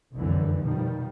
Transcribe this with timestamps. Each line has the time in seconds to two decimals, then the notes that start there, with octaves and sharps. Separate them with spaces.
0.14 F1 C2 F#2 D3 E3
0.63 B2 D#3 F3 G3